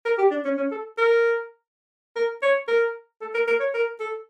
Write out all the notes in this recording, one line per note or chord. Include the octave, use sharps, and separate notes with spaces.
A#4
G4
D4
C#4
C#4
A4
A#4
A#4
C#5
A#4
A4
A#4
A#4
C#5
A#4
A4